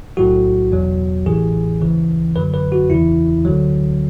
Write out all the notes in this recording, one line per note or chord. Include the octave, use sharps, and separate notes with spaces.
B1 A2 F#3 F#4
E2 B2 F#3
A1 A2 E3 G#4
D2 C#3 E3
F#2 D3 F#3 B4
B4
F#4
E2 C#3 E3 E4
D2 D3 F#3